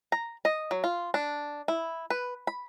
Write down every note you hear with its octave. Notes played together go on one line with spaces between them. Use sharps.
A#5
D#5
F#3
F4
D4
E4
B4
B5